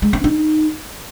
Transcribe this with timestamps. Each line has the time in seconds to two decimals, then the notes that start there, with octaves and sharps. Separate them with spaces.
0.02 G#3
0.13 C4
0.24 D#4